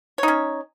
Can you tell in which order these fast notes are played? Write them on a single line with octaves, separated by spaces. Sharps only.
C#5 D#4 C#4